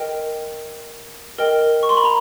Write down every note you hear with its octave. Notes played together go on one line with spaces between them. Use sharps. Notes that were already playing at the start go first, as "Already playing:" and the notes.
Already playing: A#4 D#5 G5
A#4 D#5 G5
C#6
C6
B5
A#5